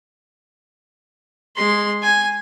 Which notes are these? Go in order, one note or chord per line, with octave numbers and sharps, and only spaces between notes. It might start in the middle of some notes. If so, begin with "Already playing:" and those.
G#3 C6
G#5